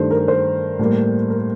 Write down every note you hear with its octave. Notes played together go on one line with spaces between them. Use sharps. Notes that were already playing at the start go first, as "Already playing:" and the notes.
Already playing: G2 D#3 A3 C5
A#4
C5
A2 G3 A#3
A#4